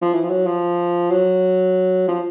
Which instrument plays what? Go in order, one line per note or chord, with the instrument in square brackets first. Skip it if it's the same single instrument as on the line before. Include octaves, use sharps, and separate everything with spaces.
[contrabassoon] F3
E3
F3
F#3
F3
F#3
F3